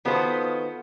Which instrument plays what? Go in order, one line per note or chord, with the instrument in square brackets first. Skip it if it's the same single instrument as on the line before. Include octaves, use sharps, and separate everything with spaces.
[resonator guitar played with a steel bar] D#3 B3 F4 F#4 A4 C5